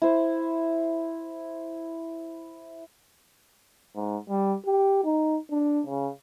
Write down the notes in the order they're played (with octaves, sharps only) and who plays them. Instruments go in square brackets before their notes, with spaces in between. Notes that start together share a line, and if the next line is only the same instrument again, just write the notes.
[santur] E4 C5
[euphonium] G#2
G3
G4
D#4
D4
C#3